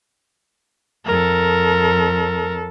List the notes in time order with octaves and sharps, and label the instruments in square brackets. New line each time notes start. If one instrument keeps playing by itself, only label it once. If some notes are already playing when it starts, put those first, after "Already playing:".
[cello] F2 A4 [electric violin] A#4